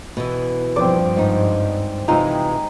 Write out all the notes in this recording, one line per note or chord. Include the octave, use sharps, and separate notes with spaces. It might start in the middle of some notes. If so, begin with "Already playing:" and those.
B2 E3
G2 F3 C4 D5
G#2 D#4
C3 E3 G#3 D#4 F4